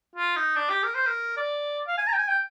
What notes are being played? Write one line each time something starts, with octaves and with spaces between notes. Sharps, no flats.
F4
D#4
D4
G4
A#4
C5
A#4
D5
F5
G#5
A#5
G5
G#5
G5